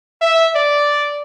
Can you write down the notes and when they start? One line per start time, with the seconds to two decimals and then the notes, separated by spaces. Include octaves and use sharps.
0.21 E5
0.56 D5